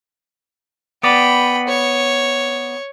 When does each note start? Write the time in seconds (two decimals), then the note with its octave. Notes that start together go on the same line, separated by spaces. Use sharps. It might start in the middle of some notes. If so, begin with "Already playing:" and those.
1.03 B3 D5 G5 B5
1.68 C#5